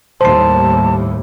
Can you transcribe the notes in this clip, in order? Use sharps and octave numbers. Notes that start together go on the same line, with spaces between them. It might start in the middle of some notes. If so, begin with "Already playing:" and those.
D#2 A2 G3 C5 A5 C6